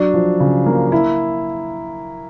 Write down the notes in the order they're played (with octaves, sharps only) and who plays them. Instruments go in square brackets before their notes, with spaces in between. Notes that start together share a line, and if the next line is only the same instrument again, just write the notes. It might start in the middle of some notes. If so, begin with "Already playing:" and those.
Already playing: [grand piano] F#3 D4
F3
C#3
A#3
E4